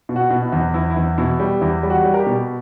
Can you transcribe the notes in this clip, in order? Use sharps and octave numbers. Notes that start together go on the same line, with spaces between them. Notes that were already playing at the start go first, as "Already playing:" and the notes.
B2
F#4
B2
E4
E2
E2 E4
E4
E2
B2 E4
G3
E2 E4
G3
F#4
G3
A#4
G4
B2